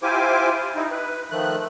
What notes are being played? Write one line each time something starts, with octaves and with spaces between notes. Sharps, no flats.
E4 F4 G4 C5 G#5 D6
D#4 E4
B4
D#3 F3 A3 F#6